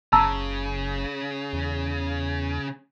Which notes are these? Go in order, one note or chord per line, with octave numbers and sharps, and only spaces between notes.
F#1 C#3 A5 A#5 E6
E2